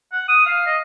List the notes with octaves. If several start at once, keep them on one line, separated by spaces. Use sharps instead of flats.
F#5
D#6
F5
D#5